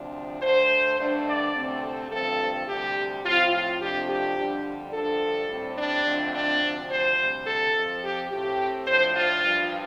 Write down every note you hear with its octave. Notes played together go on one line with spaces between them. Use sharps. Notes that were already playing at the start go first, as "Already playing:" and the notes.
Already playing: D2 C3 F3 D4
D2 D3 A3 C5
G2 D3 A3 D4
D5
D2 C3 A3 C4
A4
G2 D3 F3 A3 C4 A4
D2 C3 G3 G4
A2 F3 C4 F4
F4
F2 C3 F3 A3 D4 G4
G4
F2 D3 G3 D4
G2 D3 F3 D4 A4
A2 G3 C4
D4
F2 D3 A3 C4
D4
D2 C3 F3 C4
C5
D2 C3 G3
A4
F2 F3 C4
G4
A2 A3 C4 G4
A2 F3 D4 C5
F4
G2 F3 D4